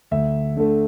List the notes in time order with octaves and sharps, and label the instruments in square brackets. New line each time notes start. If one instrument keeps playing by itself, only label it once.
[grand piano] D2 E5
D3 A3